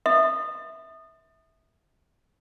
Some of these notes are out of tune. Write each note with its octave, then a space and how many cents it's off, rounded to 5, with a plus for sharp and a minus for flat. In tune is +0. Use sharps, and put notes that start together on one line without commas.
E5 -15 D#6 -20